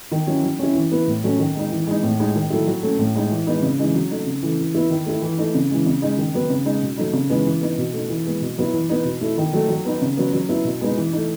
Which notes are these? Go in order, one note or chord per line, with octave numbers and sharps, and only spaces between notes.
D#3
F#3 C#4 E4
F#3
C#4 E4
E3
B3 E4
A2
F#3 A3 C#4
D#3
G#3 D#4
E3
G#3 D#4
A2
G#3 D#4
D#3
F#3 A3 E4
F#3
A3 C#4
A2
G#3 D#4
E3
G#3 B3 D#4
C#3
E3 G#3 D#4
F#3
A3 D#4
C#3
E3 A3
E3
B3 E4
D#3
A3 E4
E3
A3 D#4
C#3
E3 G#3
C#3
G#3 D#4
D#3
F#3 B3
C#3
G#3 D#4
B2
F#3 A3 D#4
C#3
E3 G#3 B3 D#4
E3
B3 D#4
B2
A3 D#4
E3
G#3 B3
B2
F#3 B3 E4
E3
B3 D#4
B2
A3 E4
D#3
F#3 A3
F#3
B3 D#4
C#3
F#3 B3
F#3
B3 E4
B2
G#3 B3 D#4
E3
A3 D#4